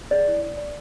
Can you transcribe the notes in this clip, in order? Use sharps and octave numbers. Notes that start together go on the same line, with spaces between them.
G#4 D5
E4
D5
D5